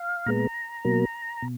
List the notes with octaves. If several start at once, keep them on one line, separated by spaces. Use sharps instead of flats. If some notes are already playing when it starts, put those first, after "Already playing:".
Already playing: F5
A#2 G#3 B3 A#5
B2 F#3 A#3
B2